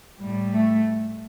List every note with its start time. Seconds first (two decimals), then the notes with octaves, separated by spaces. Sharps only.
0.19 A2 G3
0.52 A3